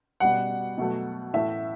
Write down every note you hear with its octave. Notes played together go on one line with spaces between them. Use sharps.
B2 G3 F#5
B2 F#3 A3
A2 E3 A3 E5